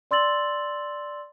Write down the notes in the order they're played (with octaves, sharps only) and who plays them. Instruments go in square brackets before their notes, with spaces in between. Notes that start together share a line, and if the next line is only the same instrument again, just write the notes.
[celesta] D5 C6 E6 A6 F#7